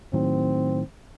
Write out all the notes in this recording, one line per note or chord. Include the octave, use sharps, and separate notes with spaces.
A2 D#3 F#3 C4